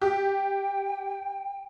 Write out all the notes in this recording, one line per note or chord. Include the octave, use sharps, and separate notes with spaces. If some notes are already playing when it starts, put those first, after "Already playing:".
G4 G5